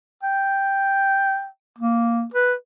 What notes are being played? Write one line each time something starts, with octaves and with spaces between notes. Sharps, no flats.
G5
A#3
B4